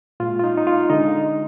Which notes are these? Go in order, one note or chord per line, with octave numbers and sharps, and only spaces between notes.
A#2 G#3 F4
F4
D#4
D#4
F4
D3 G#3 D#4